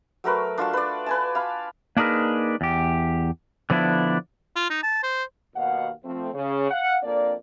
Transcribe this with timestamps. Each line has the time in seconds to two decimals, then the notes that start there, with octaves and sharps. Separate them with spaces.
0.24 F#3 A3 A#4 B4
0.58 D4 F4 F#4 A5
0.73 B4 D5
1.06 B4 G#5 A5
1.35 F5 B5
1.97 A#3 D4 D#4 G#4 A#4 B4
2.61 E2 G4
3.70 D3 F3 B3 D4 E4
4.56 F4
4.70 D#4
4.83 A5
5.03 C5
5.56 D#2 B2 F5 F#5
6.05 F3 A3 C4
6.34 C#3
6.71 F5 F#5
7.03 F2 A#3 D4 D5